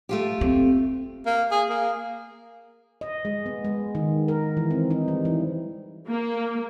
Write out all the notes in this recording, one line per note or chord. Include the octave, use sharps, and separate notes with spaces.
A3 F4 G4
C4
A#3
G#4
A#3
D#5
G#3
B3
G#3
D#3
A#4
E3
C4
D#4
G3
E3
A#3